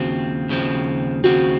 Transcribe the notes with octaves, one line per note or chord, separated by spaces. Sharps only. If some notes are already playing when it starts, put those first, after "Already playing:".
Already playing: D#2 C#3 F3 C4 F#4
D#2 C#3 F3 C4
D#2 C#3 F3 C4 F#4